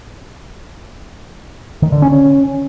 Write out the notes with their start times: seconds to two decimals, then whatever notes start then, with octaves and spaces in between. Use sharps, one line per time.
1.82 D#3
1.92 D3
2.02 C#4
2.12 C#4